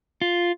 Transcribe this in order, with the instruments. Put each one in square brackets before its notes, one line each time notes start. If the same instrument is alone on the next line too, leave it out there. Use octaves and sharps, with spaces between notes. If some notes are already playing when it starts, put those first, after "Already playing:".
[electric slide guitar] F4